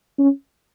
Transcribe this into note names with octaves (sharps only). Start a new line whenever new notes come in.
C#4